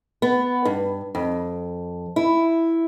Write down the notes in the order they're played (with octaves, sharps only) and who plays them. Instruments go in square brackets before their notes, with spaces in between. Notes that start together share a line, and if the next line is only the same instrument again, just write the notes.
[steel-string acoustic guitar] B3
G2
F2
E4